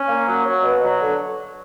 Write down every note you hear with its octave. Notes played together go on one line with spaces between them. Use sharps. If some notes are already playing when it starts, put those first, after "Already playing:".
Already playing: C#4
A#3
F#3
F#3
B2
F#3
D3